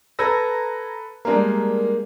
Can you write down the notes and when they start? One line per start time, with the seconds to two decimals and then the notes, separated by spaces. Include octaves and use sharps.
0.19 A4 B4 A#5 E6 G#6 A#6
1.25 G3 G#3 A#3 D4 A#4